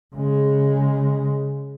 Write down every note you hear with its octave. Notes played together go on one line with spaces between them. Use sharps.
C#3 G#3